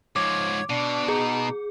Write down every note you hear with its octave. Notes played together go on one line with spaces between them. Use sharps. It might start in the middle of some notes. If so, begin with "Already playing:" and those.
G#2 F3 C#5 D6
B2 D4
D#4 G#4